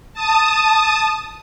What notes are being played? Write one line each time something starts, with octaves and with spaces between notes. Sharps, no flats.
A5 D#6